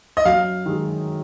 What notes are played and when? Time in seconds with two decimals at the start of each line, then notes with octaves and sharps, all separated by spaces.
0.17 D#5
0.25 F#2 F5
0.66 D#3 G#3